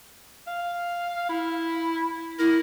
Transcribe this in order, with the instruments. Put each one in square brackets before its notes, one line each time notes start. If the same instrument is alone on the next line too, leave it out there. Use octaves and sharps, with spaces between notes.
[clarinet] F5
E4
[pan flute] E4 [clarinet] A#4